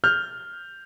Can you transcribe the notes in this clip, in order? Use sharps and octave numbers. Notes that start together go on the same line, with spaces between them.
F6 G6